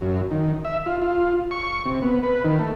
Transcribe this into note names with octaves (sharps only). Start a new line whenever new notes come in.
F#2
D#3
E5
F4
F4
C#6
C3
B3
B4
D#3
A3